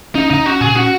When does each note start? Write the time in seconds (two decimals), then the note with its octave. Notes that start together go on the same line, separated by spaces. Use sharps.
0.15 C#4 D#4
0.30 C#3 D#4
0.46 C#4 F#4
0.61 A#2 G#4
0.76 C#4 F#4